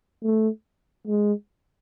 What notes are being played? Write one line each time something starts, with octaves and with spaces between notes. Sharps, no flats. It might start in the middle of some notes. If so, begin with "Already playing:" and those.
A3
G#3